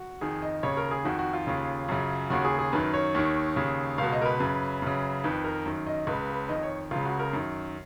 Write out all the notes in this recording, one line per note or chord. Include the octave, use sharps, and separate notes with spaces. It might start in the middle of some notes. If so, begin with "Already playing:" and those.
Already playing: F#4
F2 D#3 G#4
D#5
D#2 C#3 C#5
A#4
G#4
F2 D#3 F#4
F#4
F4
D#2 C#3
F#2 C#3
D#2 C#3 F#4
G#4
G#4
F#2 D#3 B4
C#5
D#2 D#3
D#2 C#3
C#2 B2 F5
D#5
A#4
B4
F#2 C#3
F#2 C#3
F2 D#3 B4
A#4
F#2 D#3
D#5
C#2 C#3 B4
B4
F2 D#3 D#5
C#5
C#2 C#3 F4
F#4
A#4
F#2 D#3